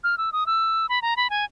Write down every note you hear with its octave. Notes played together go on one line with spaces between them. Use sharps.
F6
E6
D#6
E6
B5
A#5
B5
G#5